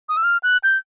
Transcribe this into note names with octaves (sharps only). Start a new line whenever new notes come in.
D#6
E6
F6
F#6
G6